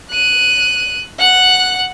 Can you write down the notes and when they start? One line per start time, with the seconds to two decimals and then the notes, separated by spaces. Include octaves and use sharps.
0.11 F#6 D#7
1.19 F#5 F#6